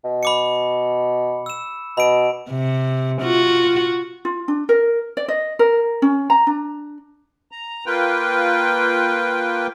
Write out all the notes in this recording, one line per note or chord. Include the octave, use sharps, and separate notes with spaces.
B2
B5 D6 C#7
E6 E7
B2 B5 D7
C3
F4 F#4
F4
D4
A#4
D5
D#5
A#4
C#4
A#5
D4
A#5
A#3 F4 B4 G5